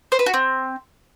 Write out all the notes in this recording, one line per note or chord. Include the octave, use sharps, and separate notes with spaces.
C5
B4
F#4
C4